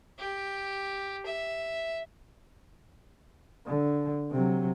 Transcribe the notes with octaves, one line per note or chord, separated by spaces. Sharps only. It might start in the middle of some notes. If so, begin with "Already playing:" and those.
G4
E5
D3
C3 F#3